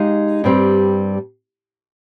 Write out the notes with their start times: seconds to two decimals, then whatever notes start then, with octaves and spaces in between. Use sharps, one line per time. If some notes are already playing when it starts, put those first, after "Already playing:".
Already playing: G#3 D#4 G4 F5
0.44 G2 G3 C4 G4